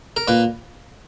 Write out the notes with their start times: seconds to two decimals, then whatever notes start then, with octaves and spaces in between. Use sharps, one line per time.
0.17 A#4
0.28 A#2 B4